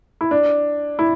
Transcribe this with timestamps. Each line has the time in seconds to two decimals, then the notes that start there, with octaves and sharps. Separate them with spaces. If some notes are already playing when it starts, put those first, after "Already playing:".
0.21 E4
0.31 D4
0.99 E4